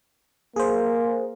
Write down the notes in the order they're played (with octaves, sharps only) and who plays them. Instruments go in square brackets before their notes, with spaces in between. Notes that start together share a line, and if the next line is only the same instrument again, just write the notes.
[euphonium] A#3 [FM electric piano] G#4 C5